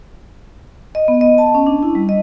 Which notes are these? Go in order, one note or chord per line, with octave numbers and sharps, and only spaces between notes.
D#5
B3
D#5
A5
C#4
D4
E4
G3
D#5